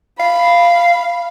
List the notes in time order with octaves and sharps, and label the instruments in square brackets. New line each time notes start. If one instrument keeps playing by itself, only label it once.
[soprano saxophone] F5 [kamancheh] B5